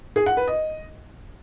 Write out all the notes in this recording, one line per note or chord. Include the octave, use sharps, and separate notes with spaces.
G#4
F#5
B4
D#5